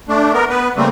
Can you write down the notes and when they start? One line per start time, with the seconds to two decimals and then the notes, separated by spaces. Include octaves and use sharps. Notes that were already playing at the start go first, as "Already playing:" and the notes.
0.09 A3 D4
0.33 B3 A#4
0.49 B3 B4
0.77 C#3 G3 A3 A#3 C4